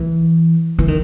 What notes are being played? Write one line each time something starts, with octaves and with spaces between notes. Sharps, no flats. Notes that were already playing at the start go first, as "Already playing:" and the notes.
Already playing: E3
E3
D#3